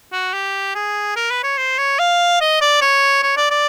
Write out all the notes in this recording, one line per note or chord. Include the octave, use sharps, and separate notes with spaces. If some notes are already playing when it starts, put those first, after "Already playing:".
F#4
G4
G#4
A#4
B4
C#5
C5
C#5
F5
D#5
D5
C#5
C#5
D5
D5